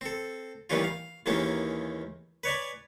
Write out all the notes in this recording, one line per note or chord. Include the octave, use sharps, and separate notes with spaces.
C4 A4
A#2 D#3 E3 G3 C#4 F4
F5
D#2 D#3 E3 G#3 A#3 C#4
B4 C#5 D5 G#5